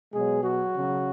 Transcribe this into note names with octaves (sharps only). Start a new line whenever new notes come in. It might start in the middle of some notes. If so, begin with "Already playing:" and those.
B2 F#3 G#3 G#4
F#3 F#4
C#3 F#3